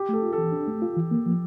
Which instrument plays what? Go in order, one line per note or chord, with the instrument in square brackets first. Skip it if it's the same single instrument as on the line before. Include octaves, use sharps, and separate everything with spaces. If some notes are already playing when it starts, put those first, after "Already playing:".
Already playing: [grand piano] G4
[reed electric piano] A3 [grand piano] A4
[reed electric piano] F4
[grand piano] A4
[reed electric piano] E3
D4
A3
F4
E3
A#3
F3